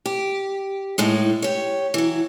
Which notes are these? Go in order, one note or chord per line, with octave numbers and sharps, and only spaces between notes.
G4
A2 G#3 D#4
G4 C#5
E3 F#3